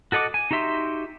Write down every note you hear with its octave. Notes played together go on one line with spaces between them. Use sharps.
F#4 A4 D#5 F#5 D6
G#5
D#4 F#4 G4 E5 C6